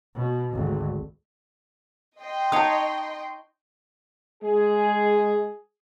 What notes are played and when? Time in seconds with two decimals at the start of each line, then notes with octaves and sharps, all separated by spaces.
0.16 B2
0.53 G#1 D2
2.20 D#5 G5 C6
2.52 D#4 C#5 A5 D#6
4.43 G#3 G#4